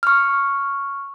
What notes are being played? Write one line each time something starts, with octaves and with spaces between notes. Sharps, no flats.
C#6 F6